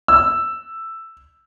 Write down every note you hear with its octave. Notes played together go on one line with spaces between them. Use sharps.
E6